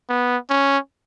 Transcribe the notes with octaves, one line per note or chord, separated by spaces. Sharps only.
B3
C#4